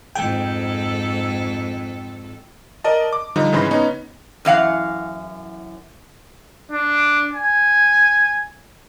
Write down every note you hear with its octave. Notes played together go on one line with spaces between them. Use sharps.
F2 G#2 A4 G5
A#4 D5 D#5 A5
D6
D3 F3 G3 D#4
G#2 C#3 E3 B5 C6 A#6
B3 C#4 D#4
F#2 E3 F5 F#5
D4
G#5